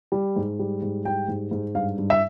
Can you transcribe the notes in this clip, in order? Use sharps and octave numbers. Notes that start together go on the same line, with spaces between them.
G3
G#2
G3
G#2
G3 G5
G#2
G#2
G2 F5
G2
E5